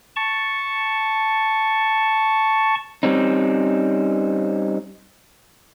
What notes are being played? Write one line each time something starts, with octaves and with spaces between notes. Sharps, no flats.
A5 C#6
G3 C4 C#4 D#4